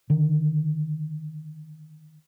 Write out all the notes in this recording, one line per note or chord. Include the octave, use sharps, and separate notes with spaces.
D3 D#3